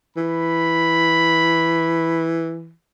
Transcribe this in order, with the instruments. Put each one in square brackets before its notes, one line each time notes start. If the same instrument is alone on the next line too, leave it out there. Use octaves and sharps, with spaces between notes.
[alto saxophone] E3 [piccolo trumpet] B5